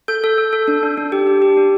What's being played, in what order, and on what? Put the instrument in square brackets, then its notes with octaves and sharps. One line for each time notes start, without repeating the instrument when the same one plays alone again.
[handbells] A4 G6
A4
A4
A4
D4
D4
D4
G4
G4
G4
D4